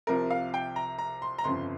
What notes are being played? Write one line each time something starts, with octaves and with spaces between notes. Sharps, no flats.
C2 C3 F3 A#4
F5
G5
A#5
A#5
C6
A#5
G1 F2 C#3 F3 C6